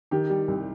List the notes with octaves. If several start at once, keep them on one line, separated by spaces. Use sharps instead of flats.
D#3 G4
G3
C2